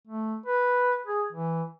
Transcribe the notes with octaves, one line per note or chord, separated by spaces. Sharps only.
A3
B4
G#4
E3